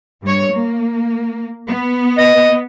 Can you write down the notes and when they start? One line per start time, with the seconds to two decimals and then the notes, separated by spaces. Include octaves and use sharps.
0.22 G2 C#5
0.52 A#3
1.68 B3
2.18 D#5